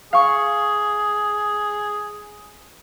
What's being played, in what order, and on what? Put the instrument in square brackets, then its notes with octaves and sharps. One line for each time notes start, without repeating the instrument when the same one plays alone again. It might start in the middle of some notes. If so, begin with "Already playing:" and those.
[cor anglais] G#4 [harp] F5 C#6